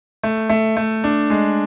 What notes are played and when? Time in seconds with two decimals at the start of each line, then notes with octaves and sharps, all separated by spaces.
0.23 A3
0.50 A3
0.77 A3
1.04 D4
1.30 G#3